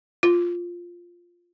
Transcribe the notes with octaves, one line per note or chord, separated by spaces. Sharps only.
F4